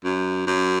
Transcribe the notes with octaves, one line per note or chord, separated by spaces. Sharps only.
F#2
F#2